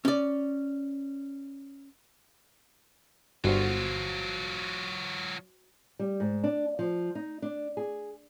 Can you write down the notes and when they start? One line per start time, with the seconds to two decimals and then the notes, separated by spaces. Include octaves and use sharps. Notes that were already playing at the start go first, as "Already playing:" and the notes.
0.05 C#4 D5
3.44 G1 F#3 F4 F#4 C5
5.99 G3
6.20 G#2
6.44 D4
6.79 F3
7.15 D#4
7.42 D4
7.77 G#4